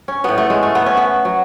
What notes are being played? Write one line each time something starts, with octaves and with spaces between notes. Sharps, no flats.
C#4
A2 F#3 B3
A3
G#3
A3
B3
C#4
B3
F#3